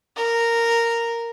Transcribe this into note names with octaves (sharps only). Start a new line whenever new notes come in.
A#4